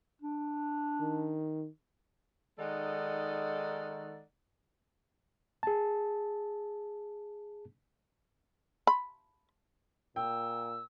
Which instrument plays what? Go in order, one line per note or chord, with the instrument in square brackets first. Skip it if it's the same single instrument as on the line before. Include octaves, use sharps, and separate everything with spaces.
[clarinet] D4
[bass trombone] D#3
[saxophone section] D#3 G#3 D#4 A4 D5 F#5
[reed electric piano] G#4 A5
[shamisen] B5
[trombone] A#2 [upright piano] G5 [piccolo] E6